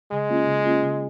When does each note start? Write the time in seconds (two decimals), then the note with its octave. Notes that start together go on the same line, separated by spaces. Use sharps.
0.11 C#3 G#3
0.29 A#3 C#4 F4
0.47 C#3
0.65 A#3 C#4 F4
0.83 C#3